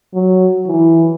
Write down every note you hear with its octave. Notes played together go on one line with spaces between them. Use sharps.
F#3
E3